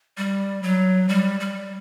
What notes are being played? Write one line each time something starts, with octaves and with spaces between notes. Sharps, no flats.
G3
F#3
G3
G3